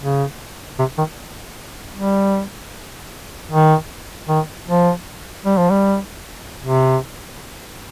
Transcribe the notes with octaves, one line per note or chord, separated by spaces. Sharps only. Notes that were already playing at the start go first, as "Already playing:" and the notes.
C#3
C3
D#3
G3
D#3
D#3
F3
G3
F3
G3
C3